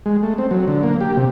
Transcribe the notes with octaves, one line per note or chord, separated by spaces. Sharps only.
G#3
A3
C4
F#3
D3
A#3
G4
C3